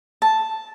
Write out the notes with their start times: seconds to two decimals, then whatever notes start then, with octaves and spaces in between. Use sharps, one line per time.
0.22 A5